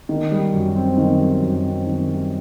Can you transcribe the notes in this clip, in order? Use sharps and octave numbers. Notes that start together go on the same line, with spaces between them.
D#3
G3
F#2
C4
D#3
G3
F#2
C4
D#3
G3